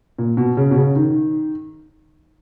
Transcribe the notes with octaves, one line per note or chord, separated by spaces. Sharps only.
A#2
B2
C#3
B2
C#3
D#3